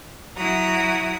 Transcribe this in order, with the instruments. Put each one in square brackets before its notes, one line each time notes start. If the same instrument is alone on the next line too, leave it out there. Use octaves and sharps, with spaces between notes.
[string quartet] F#3 E4 F#4 A#5 D#6